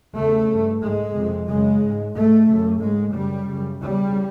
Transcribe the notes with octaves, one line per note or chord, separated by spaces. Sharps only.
E2 C#3 A3
G2
G#2 G#3
F2 C3
F#2 C#3 G#3
G#2
G#2 A3
F#2 C#3
G#2 G#3
F#2 C#3 G3
F#2 C#3
E2 C#3 G3